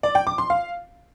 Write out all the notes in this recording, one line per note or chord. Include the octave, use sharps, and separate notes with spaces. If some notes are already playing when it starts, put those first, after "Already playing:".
D5
G5
D6
C6
F5